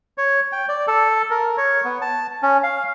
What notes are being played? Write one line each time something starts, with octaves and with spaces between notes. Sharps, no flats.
C#5
G5
D5
A4
A#4
C#5
B3
A5
C#4
F5